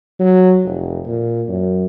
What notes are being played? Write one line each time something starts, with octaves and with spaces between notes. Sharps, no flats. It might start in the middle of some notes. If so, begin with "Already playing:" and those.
F#3
F1
A#2
F#2